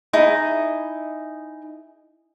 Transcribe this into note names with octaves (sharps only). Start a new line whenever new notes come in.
D#4 E4 G#4